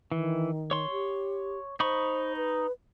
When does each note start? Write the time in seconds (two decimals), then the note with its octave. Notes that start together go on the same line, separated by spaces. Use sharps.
0.12 D#3 E3
0.71 C#5 C6
0.91 G4
1.80 D#4 C5 B5 C#6
2.37 B4